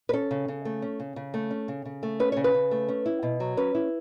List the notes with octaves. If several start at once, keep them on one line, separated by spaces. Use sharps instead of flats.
B4
C#4 A4
C#3
C#3
A3
C#4
C#3
C#3
A3
C#4
C#3
C#3
A3
C#4 B4
C#3 C#5
B4
C#3
A3
C#4
E4
B2
F#3
C#4 B4
E4